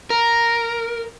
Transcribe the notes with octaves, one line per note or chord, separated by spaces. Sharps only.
A#4